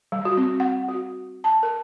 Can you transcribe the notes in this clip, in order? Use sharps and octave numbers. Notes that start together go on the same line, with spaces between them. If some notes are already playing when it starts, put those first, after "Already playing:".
G3
F#4
C4
F#5
F#4
A5
A#4